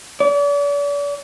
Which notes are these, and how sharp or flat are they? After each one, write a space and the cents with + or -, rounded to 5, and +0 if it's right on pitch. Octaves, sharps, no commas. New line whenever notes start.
D5 -40